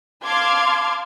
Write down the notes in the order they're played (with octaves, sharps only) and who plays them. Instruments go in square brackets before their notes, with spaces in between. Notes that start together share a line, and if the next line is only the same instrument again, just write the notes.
[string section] F5 A5 C6 D6 F6 G#6